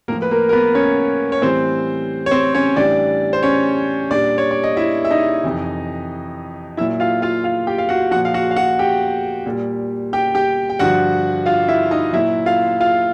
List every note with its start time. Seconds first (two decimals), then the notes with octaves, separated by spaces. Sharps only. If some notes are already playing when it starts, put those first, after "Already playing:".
0.08 A2 F3 A#3 A#4
0.22 B4
0.31 A#3 A#4
0.49 A#4
0.53 B3 B4
0.75 C#4 C#5
1.32 C#5
1.42 A2 E3 G3 C4 C5
2.26 C#5
2.31 C4 C5
2.55 C#4 C#5
2.76 A2 E3 G3 D4 D5
3.33 C5
3.43 C#4 C#5
4.11 A#2 G3 D4 D5
4.38 C#5
4.51 D5
4.64 D#5
4.77 E4 E5
5.05 E5
5.10 D#4 D#5
5.44 F2 C3 E3
6.77 A#2 F#3 E4 E5
7.00 F4 F5
7.22 F4 F5
7.44 F4 F5
7.67 G4 G5
7.78 F5
7.89 F#4 F#5
8.11 F3 F#4 F#5
8.16 A#2
8.25 F5
8.34 F#4 F#5
8.51 F5
8.56 F#4 F#5
8.79 G4 G5
9.46 A#2 G3
10.13 G4 G5
10.35 G4 G5
10.70 G5
10.79 G2 D3 F3 F#4 F#5
11.46 F4 F5
11.68 E4 E5
11.91 D#4 D#5
12.13 A#2 F#3 E4 E5
12.46 F4 F5
12.81 F4 F5